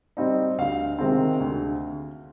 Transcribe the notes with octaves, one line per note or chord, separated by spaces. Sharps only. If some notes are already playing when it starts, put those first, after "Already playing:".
G3 C4 D#4
D2 F5
C3 D#3 G#3 C4
D2